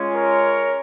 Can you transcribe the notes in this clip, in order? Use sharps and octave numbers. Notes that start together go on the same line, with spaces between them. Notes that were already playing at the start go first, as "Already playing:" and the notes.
Already playing: G#3 C#4 F4
A#4 C#5